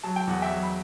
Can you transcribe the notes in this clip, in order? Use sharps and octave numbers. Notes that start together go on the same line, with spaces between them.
F#3 A5
G5
E2 F#5
E5 G5
F#3
B5